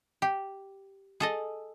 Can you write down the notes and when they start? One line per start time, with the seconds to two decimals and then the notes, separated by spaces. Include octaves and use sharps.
0.22 G4
1.20 G#4 A4 D#5